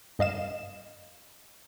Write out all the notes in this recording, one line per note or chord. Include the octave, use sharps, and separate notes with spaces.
G2 D#5 F5 E7